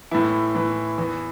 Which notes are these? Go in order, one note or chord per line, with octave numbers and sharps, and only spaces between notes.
A2 E3 E4
A2 E3
E2 E3